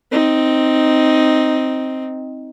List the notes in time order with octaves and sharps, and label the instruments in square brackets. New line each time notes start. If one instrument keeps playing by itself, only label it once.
[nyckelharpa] C4 D#4